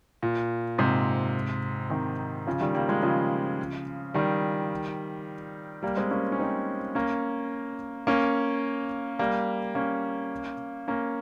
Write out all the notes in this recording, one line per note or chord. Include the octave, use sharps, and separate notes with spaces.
A#2
G#2 C3
C3 D#3
C#3 F3
D#3 G3
G3 A#3
F3 G#3
C#3 F3
D#3 G3
G3 A#3
G#3 C4
A#3 C#4
C#4
C4 D#4
A#3 C#4
A#3 C#4
G3 A#3
A#3 C#4
A#3 C#4